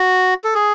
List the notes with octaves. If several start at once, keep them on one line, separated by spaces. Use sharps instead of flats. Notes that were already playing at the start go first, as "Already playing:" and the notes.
Already playing: F#4
A4
G#4